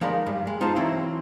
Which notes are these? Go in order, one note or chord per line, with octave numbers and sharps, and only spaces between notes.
F3 G#3 D#4 A#4 D5 B5
G2
G#3
D#4 F4 G#4 C5 A5
E3 F#3 C4 E4